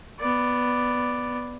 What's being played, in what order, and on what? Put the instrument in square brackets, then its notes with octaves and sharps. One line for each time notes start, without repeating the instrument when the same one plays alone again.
[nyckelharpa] B3 D5